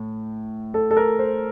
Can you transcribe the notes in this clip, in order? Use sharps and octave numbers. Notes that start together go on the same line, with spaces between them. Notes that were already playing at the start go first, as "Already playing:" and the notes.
Already playing: A2
A4
A4
A#4
C5